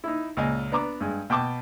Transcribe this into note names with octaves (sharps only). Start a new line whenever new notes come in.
D#4 E4
C#2 A#2 D#5 G#5
B3 D4 A#5 D6
G2 G#3
B2 G5 A5 D6